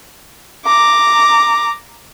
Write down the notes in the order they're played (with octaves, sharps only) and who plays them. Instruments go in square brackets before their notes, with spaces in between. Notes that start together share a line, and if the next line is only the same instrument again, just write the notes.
[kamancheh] A#5 D6